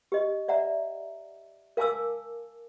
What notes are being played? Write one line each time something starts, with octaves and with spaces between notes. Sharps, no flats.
G4 D#5
D5 E5 F#5 A#5
A#4 F5 G#5 A5 D6 E6